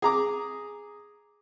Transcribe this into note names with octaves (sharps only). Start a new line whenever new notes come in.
G#4 A#5 D6